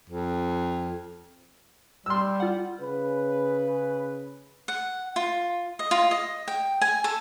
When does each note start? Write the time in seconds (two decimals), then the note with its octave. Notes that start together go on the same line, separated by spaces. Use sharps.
0.09 F2
2.06 G3 C6 E6
2.40 F4 F#5
2.80 C#3 B4
4.68 F#5
5.16 F4
5.79 D#5
5.91 F4
6.11 D#5
6.48 G5
6.81 G#5
7.04 A4